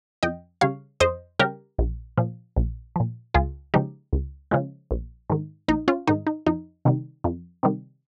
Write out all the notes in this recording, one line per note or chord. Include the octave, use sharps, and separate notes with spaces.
F2 D#5 G5
C#3 G3 C#5 F5
F2 C5 D#5
C#3 G3 G4 A#4
A#1
A#2 F3
A#1
A#2 F3
C#2 F4 G#4
C#3 F3 G#3 D#4 G4
C#2
C#3 F3 G#3
A#1
G#2 D#3
A#1 D#4
C#4 F4
G#2 D#3 D#4
D#4
F2 D#4
C3 D#3 G3
F2
C3 D#3 G3